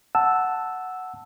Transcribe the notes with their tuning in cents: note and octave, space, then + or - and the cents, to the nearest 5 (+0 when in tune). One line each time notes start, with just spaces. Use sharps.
F#5 +0 A5 +0 E6 +0